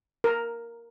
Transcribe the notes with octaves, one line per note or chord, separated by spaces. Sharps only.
A#4